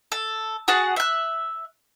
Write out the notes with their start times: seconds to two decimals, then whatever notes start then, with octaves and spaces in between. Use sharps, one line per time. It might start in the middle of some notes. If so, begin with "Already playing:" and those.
0.12 A4
0.68 F#4 G#4 F#5 A5
0.96 E5 F#6